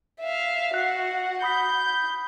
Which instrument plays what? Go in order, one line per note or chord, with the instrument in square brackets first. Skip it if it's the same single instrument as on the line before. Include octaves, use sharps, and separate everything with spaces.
[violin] E5 F5
[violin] F#4 F#5 [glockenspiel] F#6 C7
[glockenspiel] B5 D#6 B6 [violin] G6